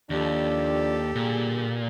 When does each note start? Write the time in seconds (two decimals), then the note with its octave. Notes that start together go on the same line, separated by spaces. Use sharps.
0.10 D#2 F3 D4 G4 A4
1.15 A#2 D3 G3 G#4